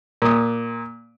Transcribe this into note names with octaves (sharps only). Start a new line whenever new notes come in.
A#2 D#6